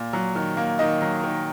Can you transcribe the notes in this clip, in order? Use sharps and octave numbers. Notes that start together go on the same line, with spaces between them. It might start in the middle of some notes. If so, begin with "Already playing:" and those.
Already playing: A#2
F#3
D#3
A#3
D#3 D#5
F#3
D#3